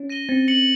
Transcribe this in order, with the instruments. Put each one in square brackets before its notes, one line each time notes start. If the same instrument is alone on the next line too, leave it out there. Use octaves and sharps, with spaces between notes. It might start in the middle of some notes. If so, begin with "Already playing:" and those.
Already playing: [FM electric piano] C#4
[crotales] A#6 D#7 G7
[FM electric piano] C4 [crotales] A6
[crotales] C#7 F#7